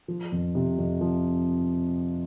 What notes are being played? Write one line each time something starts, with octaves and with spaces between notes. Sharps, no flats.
F3
F2
C3
F2
F3